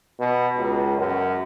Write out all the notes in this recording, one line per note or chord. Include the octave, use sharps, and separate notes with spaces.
B2
C#2
F#2